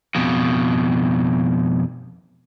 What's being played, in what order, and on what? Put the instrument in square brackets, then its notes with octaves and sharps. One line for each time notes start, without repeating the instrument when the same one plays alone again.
[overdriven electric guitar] F2 B2